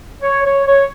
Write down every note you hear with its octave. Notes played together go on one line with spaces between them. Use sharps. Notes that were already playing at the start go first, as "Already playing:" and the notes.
C#5
C#5
C#5